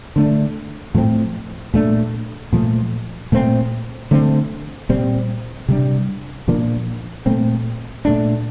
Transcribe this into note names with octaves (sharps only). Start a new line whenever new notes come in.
D3 A3 D4
A2 F3 A3 C4
A#2 A3 D4
A#2 F3 A3
A#2 A3 C4
D3 A3 C4
A#2 G3 C4
C3 G3 D4
A#2 F3 A#3 D4
A#2 A3 C4
A#2 A3 D4